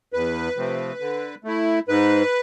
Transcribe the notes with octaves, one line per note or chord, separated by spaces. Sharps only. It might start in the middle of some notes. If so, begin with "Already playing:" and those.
E2 B4
C3 F3 A3 C4
D3
A3 E4
G#2 B4